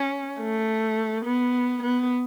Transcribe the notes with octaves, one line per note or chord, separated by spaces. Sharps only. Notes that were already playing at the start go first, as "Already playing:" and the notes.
Already playing: C#4
A3
B3
B3